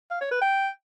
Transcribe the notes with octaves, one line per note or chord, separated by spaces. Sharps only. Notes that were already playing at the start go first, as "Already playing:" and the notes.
F5
C#5
B4
G5